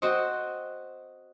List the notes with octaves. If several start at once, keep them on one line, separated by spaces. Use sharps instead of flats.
C4 F#4 C5 D#5